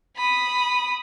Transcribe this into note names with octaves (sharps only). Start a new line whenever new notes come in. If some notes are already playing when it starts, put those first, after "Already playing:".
B5 D#6